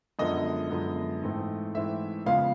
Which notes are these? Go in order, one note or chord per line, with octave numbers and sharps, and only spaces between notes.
F#2 D3 F3 G#3 B3 D#5
F#2 D3 F3 G#3 B3
G#2 E3 A3 C4
G#2 E3 A3 C4 E5
C#3 F3 G#3 B3 F5